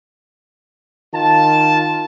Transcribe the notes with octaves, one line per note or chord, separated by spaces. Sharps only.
D#3 F4 A5